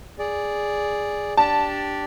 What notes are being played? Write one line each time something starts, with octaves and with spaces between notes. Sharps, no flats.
G#4 D5
D4 G4 D5 A5